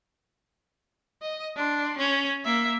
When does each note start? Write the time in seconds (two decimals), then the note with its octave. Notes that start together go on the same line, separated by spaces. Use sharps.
1.22 D#5
1.57 D4 C6
1.98 C#4
2.45 A#3 E5